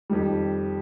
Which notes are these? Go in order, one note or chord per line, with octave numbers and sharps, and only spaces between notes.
F2 D#3 G3